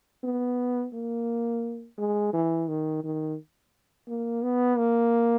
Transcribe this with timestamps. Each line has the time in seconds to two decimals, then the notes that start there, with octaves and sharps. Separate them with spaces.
0.24 B3
0.94 A#3
1.98 G#3
2.33 E3
2.68 D#3
3.04 D#3
4.08 A#3
4.43 B3
4.78 A#3